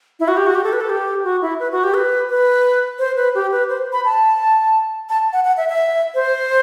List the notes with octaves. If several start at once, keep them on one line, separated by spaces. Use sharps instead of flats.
E4
F#4
G4
F#4
G4
A4
B4
A4
G4
F#4
E4
B4
F#4
G4
B4
B4
C5
B4
G4
B4
C5
B5
A5
A5
F#5
F#5
E5
E5
C5